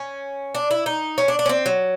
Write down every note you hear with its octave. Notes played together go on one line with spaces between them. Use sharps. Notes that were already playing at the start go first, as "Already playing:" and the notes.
Already playing: C#4
D4
E4
D#4
C#4
D4
D4
C#4
C4
F#3